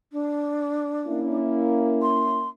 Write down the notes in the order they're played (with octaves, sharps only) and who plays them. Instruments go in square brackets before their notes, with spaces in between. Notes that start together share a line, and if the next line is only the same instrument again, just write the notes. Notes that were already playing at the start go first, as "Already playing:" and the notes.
[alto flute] D4
[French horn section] A#3 C#4 E4
[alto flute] C6